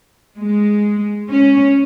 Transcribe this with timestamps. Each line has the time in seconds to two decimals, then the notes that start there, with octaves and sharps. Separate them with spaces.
0.38 G#3
1.29 C#4